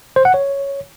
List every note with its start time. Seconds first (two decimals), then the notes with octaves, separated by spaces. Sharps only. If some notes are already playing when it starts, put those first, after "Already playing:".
0.16 C5
0.25 F#5
0.34 C#5